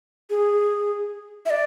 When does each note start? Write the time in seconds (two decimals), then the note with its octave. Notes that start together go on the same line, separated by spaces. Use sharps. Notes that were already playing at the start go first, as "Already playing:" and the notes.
0.30 G#4
1.46 E5
1.50 D5